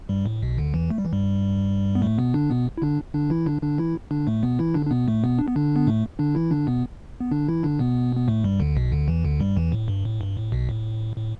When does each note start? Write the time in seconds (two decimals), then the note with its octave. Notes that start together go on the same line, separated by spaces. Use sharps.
0.09 G2 G3
0.26 A2
0.42 B1 B2
0.58 D2 D3
0.74 E2 E3
0.90 A3
0.98 G3
1.05 E3
1.13 G2 G3
1.95 B3
2.02 A2 A3
2.18 B2 B3
2.34 D3 D4
2.50 B2 B3
2.78 E4
2.82 D3 D4
3.14 D3 D4
3.30 E3 E4
3.46 D3 D4
3.62 D3 D4
3.78 E3 E4
4.11 D3 D4
4.27 A2 A3
4.43 B2 B3
4.59 E3 E4
4.74 D3 D4
4.86 D4
4.91 B2 B3
5.08 A2 A3
5.24 B2 B3
5.39 D4
5.48 B3
5.56 D3 D4
5.76 B3
5.87 A2 A3
6.19 D3 D4
6.35 E3 E4
6.51 D3 D4
6.67 B2 B3
7.20 B3
7.31 D3 D4
7.48 E3 E4
7.63 D3 D4
7.79 B2 B3
8.16 B3
8.28 A2 A3
8.44 G2 G3
8.60 D2 D3
8.76 B1 B2
8.92 D2 D3
9.08 E2 E3
9.24 D2 D3
9.40 G2 G3
9.57 E2 E3
9.72 A2
9.88 G2
10.05 A2
10.21 G2
10.37 A2
10.52 B1 B2
10.69 A2
11.17 A2